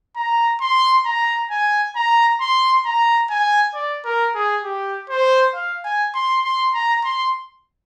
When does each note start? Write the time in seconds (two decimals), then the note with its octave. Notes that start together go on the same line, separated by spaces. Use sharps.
0.16 A#5
0.61 C6
1.05 A#5
1.51 G#5
1.96 A#5
2.40 C6
2.85 A#5
3.30 G#5
3.74 D5
4.05 A#4
4.35 G#4
4.64 G4
5.10 C5
5.54 F5
5.84 G#5
6.14 C6
6.44 C6
6.74 A#5
7.04 C6